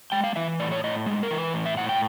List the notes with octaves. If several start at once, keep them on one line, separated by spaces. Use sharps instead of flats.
G#3 G5
F5
E3 E5
A2 D5
C#5
A2 D#5
G#3
A#4
E3
B4
A2
E5
A2 F#5
G5